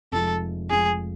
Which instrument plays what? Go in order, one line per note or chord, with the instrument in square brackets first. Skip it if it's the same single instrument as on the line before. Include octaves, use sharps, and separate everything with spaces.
[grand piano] F1 F2 F3 G#3 [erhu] A4
[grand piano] F1 F2 F3 G#3 [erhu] G#4